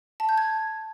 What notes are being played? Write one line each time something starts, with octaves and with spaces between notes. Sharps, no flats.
A5
G6
G#6